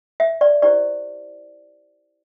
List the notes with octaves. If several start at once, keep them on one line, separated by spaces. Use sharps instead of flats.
E5
D5
E4 G4 C5 D5